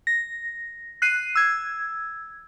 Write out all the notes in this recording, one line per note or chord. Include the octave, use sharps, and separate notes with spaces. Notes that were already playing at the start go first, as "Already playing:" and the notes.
A#6
F#6 C7 D#7
E6 G#6